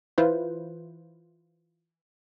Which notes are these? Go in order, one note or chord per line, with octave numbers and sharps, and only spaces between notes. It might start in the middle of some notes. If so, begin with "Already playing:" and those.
E3 E4 F4 B4 C5